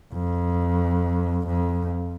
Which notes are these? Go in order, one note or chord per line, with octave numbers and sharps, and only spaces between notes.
F2
F2